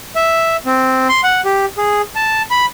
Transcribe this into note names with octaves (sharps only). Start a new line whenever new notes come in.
E5
C4
C6
F#5
G4
G#4
A5
B5